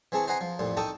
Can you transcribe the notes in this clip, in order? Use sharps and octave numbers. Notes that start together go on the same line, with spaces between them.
E3 C4 G#4 A5 C#6
C5 D#5 F#5 G#5 A#5 C6
F3
A1 F2 A#2
D#4 A4 G5 A5 C#6 D#6